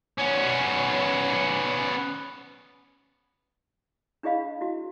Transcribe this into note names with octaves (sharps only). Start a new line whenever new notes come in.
B3 C#4
D4 E4 G#4 D#5 F5 B5
E4 F#4